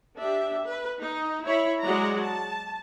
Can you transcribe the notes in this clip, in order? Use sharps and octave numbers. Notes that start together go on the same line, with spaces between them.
D4 G4 E5
B4
D#4
E4 C#5 B5
F#3 G#3 F#4 D5 F#5 A#5
A5